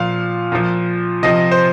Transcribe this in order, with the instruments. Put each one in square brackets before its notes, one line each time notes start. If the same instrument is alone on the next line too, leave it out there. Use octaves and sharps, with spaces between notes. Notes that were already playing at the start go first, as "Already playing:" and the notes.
Already playing: [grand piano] A#2 F3 F5
A#2 F3
C3 F3 D#5
C5